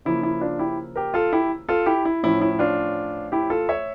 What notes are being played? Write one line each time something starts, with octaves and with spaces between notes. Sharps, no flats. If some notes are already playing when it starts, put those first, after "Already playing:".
C#3 F3 A#3 E4
E4
D4 F4
E4 G4
G4 A#4
F4 A4
E4 G4
F4 A4
E4 G4
E4
A2 F3 C#4 E4
E4
D4 F4
E4 G4
F4 A4
C#5 E5